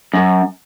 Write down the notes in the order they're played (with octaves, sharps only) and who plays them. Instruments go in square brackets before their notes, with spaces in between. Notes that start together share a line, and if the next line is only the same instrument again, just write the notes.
[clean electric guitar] F#2